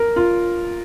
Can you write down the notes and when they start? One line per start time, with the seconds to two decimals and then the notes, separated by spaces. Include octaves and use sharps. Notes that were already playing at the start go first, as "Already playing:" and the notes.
Already playing: A#4
0.16 F4